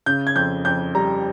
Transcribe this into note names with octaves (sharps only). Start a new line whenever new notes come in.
C#3 G6
G#6
F2 G6
F2 G6
G3 A#5